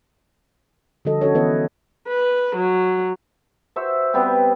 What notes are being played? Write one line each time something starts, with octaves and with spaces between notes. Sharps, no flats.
D3 F3 G3 F#4 A4 D#5
C#4 F#4 A4 C#5
E3 B3 E4 B4 D#5
B4
F#3
F#4 C5 E5
G3 B3 C4